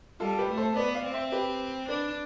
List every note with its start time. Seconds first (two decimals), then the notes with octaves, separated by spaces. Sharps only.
0.20 G3 F4 A4
0.39 G4 B4
0.49 A3
0.58 A4 C5
0.76 B3 B4 D5
0.95 D5 F5
1.05 C4
1.14 C5 E5
1.32 G4 B4
1.89 D4 B4 D5